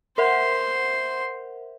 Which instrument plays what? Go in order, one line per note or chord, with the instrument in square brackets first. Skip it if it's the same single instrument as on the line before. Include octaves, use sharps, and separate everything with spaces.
[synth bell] A#4 E5 F#5 [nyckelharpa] C5 C6